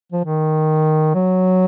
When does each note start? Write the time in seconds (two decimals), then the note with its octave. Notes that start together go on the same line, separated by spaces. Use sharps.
0.12 F3
0.25 D#3
1.15 F#3